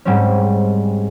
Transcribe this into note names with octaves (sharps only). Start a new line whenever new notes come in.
G#2 G3 G#3 C4 C#4